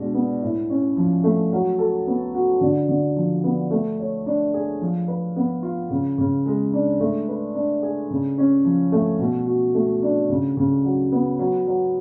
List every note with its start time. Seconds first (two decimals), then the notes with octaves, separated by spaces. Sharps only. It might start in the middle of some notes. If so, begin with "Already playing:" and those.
Already playing: B2 G#3 D4
0.14 B3
0.42 A2
0.70 C#4
0.97 F3
1.24 A3
1.52 F#3
1.79 A4
2.07 B3
2.35 F#4
2.61 D3
2.88 D3
3.16 F3
3.44 B3
3.71 A3
3.99 C#5
4.26 D4
4.54 G#4
4.81 F3
5.08 B4
5.36 B3
5.63 F4
5.90 C#3
6.18 C#3
6.46 G#3
6.73 D4
7.00 A3
7.28 B4
7.55 D4
7.83 G#4
8.11 C#3
8.38 C#4
8.65 F3
8.92 A3
9.19 B2
9.47 F#4
9.74 A3
10.02 D4
10.29 C#3
10.57 C#3
10.84 F#3
11.12 B3
11.39 F#3
11.67 F#3